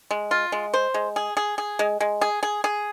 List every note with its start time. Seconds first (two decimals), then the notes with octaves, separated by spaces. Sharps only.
0.11 G#3
0.31 F4
0.52 G#3
0.74 C5
0.94 G#3
1.16 G#4
1.37 G#4
1.58 G#4
1.79 G#3
2.00 G#3
2.21 G#4
2.43 G#4
2.64 G#4